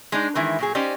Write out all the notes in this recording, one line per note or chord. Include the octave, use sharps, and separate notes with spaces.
G#3 D4 D#4
D#3 E3 G#3 E4
A#2 F#3 G#4
C#4 D#4 G4 C5 D5 D#5